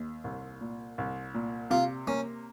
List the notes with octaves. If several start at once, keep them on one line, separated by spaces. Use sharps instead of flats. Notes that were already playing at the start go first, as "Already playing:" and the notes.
Already playing: D#2
C2
A#2
C2
A#2
C3 F4
A#3 C#4